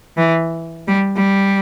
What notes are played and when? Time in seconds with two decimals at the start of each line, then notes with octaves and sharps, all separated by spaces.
0.17 E3
0.88 G3
1.16 G3